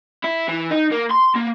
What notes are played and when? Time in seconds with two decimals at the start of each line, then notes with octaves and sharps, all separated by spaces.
0.24 E4
0.48 E3
0.71 D#4
0.92 A#3
1.11 C6
1.36 A#3